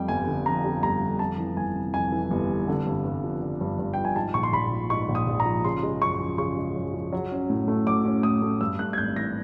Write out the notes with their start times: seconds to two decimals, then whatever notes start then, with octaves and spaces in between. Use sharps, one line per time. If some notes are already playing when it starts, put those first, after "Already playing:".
Already playing: F2 G3 G5
0.08 G1 G#5
0.27 D3
0.46 F2 A#5
0.64 G3
0.83 G1 A#5
1.01 D3
1.19 F2 A5
1.38 E3
1.57 G1 G#5
1.75 C3
1.94 F2 G#5
2.12 E3
2.31 G1
2.49 C3
2.68 D3
2.87 G2
3.05 G2
3.24 F3
3.42 D3
3.61 G2
3.79 G2
3.93 F3 G5
4.05 G#5
4.16 G#2 A5
4.34 A#1 C#6
4.43 C6
4.53 A#1 B5
4.72 F3
4.90 G#2 C#6
5.09 A#1
5.15 D#6
5.27 A#1
5.40 A#5
5.46 F3
5.64 C#3 C6
5.83 G#3
6.01 F#2 C#6
6.20 F3
6.38 C#3 C#6
6.57 G#3
6.76 F#2
6.94 F3
7.12 F#3
7.32 C#4
7.50 A2
7.68 A3
7.87 F#3 D6
8.05 C#4
8.23 A2 D#6
8.42 A3
8.61 G2 E6
8.79 A3 F#6
8.93 G#6
8.98 G#1 G6
9.16 E3 A#6